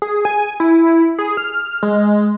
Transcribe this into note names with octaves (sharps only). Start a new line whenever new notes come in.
G#4
G#5
E4
G#4
F6
G#3